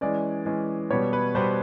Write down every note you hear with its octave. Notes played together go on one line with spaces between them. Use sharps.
E3 G#3 C#4 D5
E3 G#3 C#4
B2 G3 B3 C#5
B4
B2 G3 B3 C5